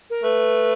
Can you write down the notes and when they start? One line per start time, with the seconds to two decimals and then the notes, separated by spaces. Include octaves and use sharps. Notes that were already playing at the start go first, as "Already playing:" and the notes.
0.10 A#4
0.23 A3 B4